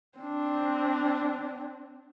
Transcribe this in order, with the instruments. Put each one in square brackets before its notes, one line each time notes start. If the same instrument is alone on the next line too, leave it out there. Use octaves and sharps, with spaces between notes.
[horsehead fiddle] C4 D4